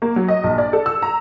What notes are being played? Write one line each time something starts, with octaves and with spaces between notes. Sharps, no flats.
A#3
F#3
D#5
A#1
D5
A4
E6
A#5